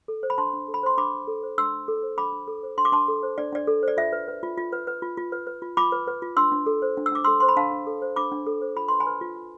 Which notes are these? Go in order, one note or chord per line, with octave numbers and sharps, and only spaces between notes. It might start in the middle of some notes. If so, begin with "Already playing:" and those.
A4
C5
B5
D4 A5 C6
D4
A4
B5
C5 C6
D4 B5 D6
D4
A4
C5
D4 C6 E6
D4
A4
C5
D4 B5 D6
D4
A4
C5
D4 C6
D6
D4 A5 C6
A4
C5
D4 D5
D4 D5
A4
C5 D5
F4 E5
B4
B4
F4
F4
B4
B4
F4
F4
B4
B4
F4
F4 B5 D6
B4
B4
F4
D4 C6 E6
D4
A4
C5
D4
E6
D4 D6
A4 C6 E6
C5 C6
B5
D4 F5 A5
D4
A4
C5
D4 B5 D6
D4
A4
C5
F4 B5
B4 C6
G#5 B5
B4
F4
F4